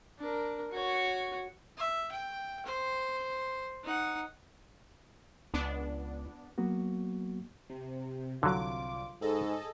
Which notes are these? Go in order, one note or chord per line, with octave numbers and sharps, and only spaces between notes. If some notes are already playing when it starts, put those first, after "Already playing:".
D4 A#4
F#4 C#5
E5
G5
C5
D#4 F#5
C#2 B3 D4
F#3 A#3 B3 F#4
C3
C2 D3 F#3 F4 D6
G#2 G#4 A4 D#5